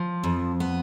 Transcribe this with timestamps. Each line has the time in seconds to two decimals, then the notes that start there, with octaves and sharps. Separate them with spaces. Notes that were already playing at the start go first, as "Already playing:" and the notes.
Already playing: F3
0.24 F2
0.60 B3